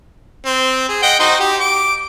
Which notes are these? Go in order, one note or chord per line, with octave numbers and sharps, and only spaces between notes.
C4
G#4
D#5 F#5 G5
D#4 F#4 C5
G4
D6